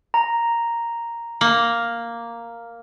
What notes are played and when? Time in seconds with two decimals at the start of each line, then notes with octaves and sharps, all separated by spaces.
0.14 A#5
1.41 A#3